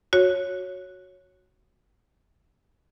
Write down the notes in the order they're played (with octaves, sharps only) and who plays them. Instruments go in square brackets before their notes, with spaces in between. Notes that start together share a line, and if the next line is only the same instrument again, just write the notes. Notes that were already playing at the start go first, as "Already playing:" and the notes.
[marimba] F#4 C#5